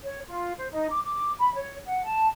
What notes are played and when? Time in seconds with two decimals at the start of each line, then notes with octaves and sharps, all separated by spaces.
0.05 C#5
0.27 F4
0.58 C5
0.72 D#4
0.89 D6
1.04 D6
1.39 B5
1.54 C#5
1.87 F#5
2.03 A5